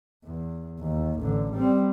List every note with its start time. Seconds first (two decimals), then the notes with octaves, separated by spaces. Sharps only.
0.24 E2
0.80 D#2
1.21 A1 D3
1.54 G3 C4